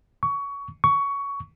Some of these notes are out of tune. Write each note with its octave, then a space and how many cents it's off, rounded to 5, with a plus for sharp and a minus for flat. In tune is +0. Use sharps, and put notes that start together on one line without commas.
C#6 +20
C#6 +15